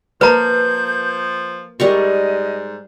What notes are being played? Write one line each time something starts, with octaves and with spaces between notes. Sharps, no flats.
F3 A#3 B4 A5 A#5 G6
G#2 G3 A#4 D#5 C#6